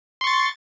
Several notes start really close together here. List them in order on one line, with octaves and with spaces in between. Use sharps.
C6 C#6 A6